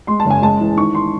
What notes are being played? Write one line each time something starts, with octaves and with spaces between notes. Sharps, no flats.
G#3 C6
A5
F#1
G#5
G#3 A5
E3
D#3 C#6
C6